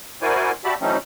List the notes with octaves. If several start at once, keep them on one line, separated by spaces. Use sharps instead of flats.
E4 F#4 A#4 C5 D5 G#5
F#4 G4 D5 E5 A5 B5
E3 F#3 A3 C4 C#4 D#4